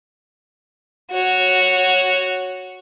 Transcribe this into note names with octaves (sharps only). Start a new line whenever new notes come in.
F#4 C#5